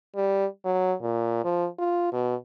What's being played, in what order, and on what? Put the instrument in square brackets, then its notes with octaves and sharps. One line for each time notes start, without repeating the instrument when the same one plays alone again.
[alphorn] G3
F#3
A#2
F3
F4
B2